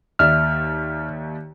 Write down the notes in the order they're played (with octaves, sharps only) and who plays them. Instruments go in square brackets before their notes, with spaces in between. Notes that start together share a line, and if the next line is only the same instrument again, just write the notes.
[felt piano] D#2 D5 E5 [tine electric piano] F6